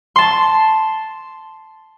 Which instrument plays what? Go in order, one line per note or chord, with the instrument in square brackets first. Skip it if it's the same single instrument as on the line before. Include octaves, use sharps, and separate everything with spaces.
[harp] A5 C6